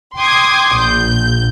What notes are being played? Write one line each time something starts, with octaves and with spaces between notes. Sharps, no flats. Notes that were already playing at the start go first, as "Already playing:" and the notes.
G5 C6 D6 D#6 G#6
A#1 G6